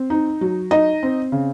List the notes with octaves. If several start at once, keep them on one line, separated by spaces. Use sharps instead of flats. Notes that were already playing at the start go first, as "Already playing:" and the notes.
Already playing: C4
D#4
F#3
D#4 D#5
C4
C#3